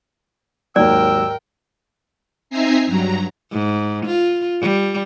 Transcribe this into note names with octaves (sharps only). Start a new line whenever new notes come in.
D#2 G#2 F#3 A#4 D5 G5 E6
C4 D#4 E5 G#5 A#5 C7
G2 F#3 A#5
G#2
F4
G3